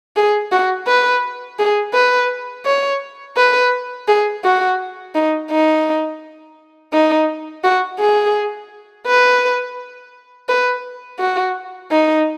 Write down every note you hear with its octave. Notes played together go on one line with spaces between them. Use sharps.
G#4
F#4
B4
G#4
B4
C#5
B4
G#4
F#4
D#4
D#4
D#4
F#4
G#4
B4
B4
F#4
D#4